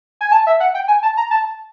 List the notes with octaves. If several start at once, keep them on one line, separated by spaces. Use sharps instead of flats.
G#5
A5
E5
F#5
G5
G#5
A5
A#5
A5